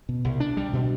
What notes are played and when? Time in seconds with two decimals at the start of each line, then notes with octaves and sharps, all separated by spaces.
0.09 B2
0.25 C2
0.40 D4
0.57 G3
0.73 B2